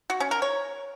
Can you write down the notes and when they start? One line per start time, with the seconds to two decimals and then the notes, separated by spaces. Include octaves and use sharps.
0.10 F#4
0.20 C#4
0.31 A#4
0.42 C#5